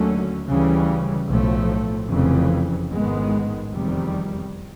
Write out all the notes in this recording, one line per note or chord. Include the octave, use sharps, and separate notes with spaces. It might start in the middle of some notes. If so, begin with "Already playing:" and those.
Already playing: D#2 D3 F#3 A3 C#4
D2 C#3 E3 G3
B1 A2 F3 A3
F1 F2 C#3 E3
A1 G#2 D#3 G#3 B3
F1 E2 C3 D#3 G3